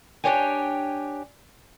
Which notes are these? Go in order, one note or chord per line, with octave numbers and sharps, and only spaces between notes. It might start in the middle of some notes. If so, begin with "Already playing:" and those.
D4 F4 G4 C#5 G5 G#5